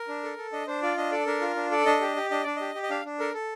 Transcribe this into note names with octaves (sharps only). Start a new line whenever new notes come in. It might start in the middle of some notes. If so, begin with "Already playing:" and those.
Already playing: A#4
D4
A4
A4
D4 D#5
D4 C5
F4 D5
D4 D#5
A4 D5
D4 A#4
F4
D4
A4 D5
D4 D#5
G4
G4
D4 D#5
D4 D5
G4 D#5
G4
D#5
D4 F5
D4
A4 A#4
A4